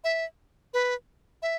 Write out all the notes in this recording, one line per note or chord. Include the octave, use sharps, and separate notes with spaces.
E5
B4
E5